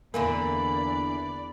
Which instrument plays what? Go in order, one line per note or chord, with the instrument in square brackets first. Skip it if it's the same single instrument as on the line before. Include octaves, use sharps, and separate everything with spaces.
[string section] E2 D5 [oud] D3 E3 A#3 [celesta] A#4 G#5 [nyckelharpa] B5